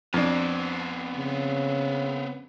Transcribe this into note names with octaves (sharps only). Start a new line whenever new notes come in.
F2 B3 C4 D4
C#3